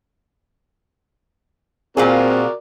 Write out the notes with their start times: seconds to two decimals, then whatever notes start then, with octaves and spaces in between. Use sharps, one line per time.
1.97 A#2 C4 F4 F#4 G#4 A#4 D5